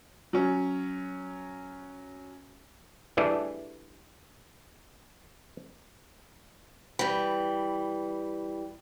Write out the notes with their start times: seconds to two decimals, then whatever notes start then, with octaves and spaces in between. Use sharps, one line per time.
0.33 F#3 C#4
3.17 E3 G3 A3 D4 E4 G#4
6.99 E3 G3